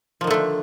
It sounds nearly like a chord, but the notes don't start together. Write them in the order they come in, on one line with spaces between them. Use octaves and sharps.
F3 D#3 D3 A3 D4